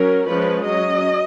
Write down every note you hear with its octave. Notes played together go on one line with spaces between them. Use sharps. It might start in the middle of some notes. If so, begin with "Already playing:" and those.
Already playing: F#3 C#4 A#4
F3 G#3 C#4 B4
F#3 C#4 D#5